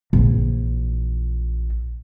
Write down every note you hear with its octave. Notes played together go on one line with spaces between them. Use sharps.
A#1 E3